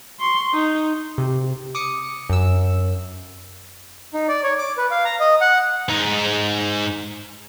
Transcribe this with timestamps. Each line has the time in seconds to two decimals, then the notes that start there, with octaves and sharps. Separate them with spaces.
0.20 C6 C#6
0.53 D#4
1.18 C3
1.75 D6 D#6 C#7
2.30 F#2 E6
4.14 D#4
4.28 D5
4.43 C#5
4.58 D6
4.77 B4
4.91 F5
5.05 A#5
5.20 D#5
5.41 F#5
5.90 G#2 D#4